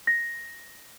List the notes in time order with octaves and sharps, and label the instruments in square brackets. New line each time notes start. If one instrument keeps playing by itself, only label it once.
[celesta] A#6